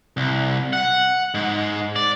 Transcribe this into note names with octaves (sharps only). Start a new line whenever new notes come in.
C2
F#5
G#2
D5